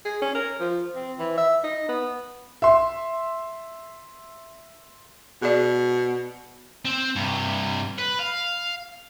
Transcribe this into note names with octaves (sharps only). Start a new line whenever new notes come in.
G#4
C#4
A#4
F3
C4
E3
E5
D#4
B3
E5 C6
B2 G#4 D5
C4
G2 C3
B4
F5